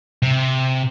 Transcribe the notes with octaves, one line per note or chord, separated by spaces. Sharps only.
C3